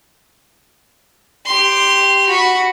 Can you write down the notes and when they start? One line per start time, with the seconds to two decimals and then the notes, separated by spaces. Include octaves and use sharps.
1.46 G4 C6
2.29 F#4 B5